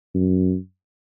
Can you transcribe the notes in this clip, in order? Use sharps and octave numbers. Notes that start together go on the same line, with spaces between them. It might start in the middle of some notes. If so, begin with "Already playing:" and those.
F#2